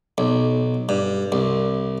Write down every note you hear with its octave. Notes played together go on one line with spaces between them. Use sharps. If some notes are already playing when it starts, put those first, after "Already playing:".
B1
G2
C2